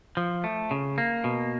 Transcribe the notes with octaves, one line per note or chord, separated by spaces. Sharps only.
F3
A3
C#3
A#3
B2